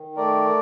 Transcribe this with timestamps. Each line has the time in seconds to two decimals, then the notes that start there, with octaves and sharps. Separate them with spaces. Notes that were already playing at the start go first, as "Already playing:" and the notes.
Already playing: D#3
0.17 A3 A#4 D5